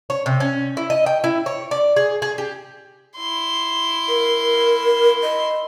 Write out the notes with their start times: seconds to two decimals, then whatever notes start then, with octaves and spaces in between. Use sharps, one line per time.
0.10 C#5
0.26 C3
0.40 C#4
0.77 E4
0.90 D#5
1.06 G5
1.24 E4
1.46 C#5
1.71 D5
1.96 G#4
2.22 G#4
2.38 G4
3.17 E4 C6
4.08 A#4
5.22 D#5